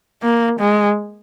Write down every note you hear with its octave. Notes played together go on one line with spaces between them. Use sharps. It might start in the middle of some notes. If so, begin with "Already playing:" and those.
A#3
G#3